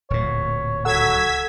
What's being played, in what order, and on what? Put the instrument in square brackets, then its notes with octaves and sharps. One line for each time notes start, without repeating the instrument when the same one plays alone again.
[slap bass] D1 A#2 [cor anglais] C#5
[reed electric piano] C#2 A4 F#5 [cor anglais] F#3 [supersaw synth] E6 G#6 B6